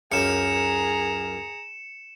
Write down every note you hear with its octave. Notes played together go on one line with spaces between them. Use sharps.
C#2 F#2 G#4 A#4 A#5 C#7 E7